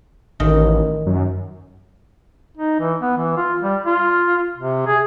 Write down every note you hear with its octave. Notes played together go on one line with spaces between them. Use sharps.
A1 D#3
F#2
D#4
E3
B3
E3
F4
G3
F4
C3
G#4